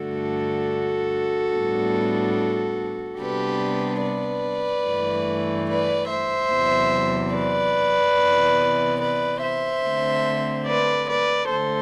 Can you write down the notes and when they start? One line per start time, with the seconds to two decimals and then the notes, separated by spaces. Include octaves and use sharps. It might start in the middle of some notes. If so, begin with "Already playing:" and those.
Already playing: G2 D3 A3 D4 F#4 A4
1.53 A2 G3 B3 D4
3.18 C3 G3 B3 D4 G4 B4
4.02 B4 D5
4.85 G2 E3 A3
5.68 B4 D5
6.10 C5 E5
6.52 E2 C3 F#3
7.35 B4 D5
8.18 C3 E3 B3
9.01 B4 D5
9.42 C5 E5
9.84 D3 A3 C4
10.67 B4 D5
11.09 B4 D5
11.50 D3 A3 A4 C5